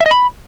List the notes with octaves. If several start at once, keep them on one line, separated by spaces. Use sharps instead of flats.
E5
D#5
B5